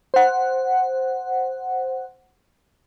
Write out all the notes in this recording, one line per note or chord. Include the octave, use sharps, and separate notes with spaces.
C5 F#5